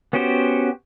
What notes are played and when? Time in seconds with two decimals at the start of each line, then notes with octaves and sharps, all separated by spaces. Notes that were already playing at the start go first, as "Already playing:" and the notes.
0.13 B3 C#4 F#4 G4 C5